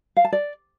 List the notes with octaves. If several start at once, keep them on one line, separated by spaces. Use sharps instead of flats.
F5
A5
D5